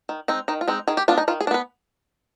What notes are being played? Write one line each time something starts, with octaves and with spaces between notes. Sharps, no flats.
D#3
G#3 C4 D#4
D#3 D#4
F4
G#3 C4 D#4
D#3 G#4
G4
B3 D4 F4
D#4
D#3 F4
G#4
D4
B3 B4